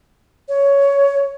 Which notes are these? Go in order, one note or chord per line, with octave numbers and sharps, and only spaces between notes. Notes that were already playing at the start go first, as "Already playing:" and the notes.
C#5